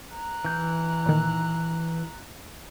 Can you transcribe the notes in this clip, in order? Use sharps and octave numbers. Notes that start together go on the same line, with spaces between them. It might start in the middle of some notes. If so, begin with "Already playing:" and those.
A#5 F#6
E3 G6
A#2 D#3